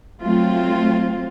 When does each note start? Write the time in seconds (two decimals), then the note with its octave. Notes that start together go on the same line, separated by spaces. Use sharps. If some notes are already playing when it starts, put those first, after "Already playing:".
0.21 F#3 A3 C4 F4